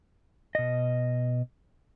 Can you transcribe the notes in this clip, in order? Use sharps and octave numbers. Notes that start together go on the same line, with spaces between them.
B2 D#5